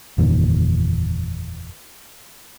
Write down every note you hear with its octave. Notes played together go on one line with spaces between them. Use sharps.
F#1 E2 A#2 D#3